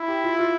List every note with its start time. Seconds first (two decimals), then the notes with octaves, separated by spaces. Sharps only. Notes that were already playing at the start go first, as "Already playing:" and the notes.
Already playing: E4
0.08 G4
0.24 F4
0.39 F4